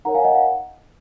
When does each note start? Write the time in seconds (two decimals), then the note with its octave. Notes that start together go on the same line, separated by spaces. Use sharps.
0.05 D#4 A#4 C#5 F#5 A#5
0.15 F5 G#5
0.24 D#5 F#5
0.35 F5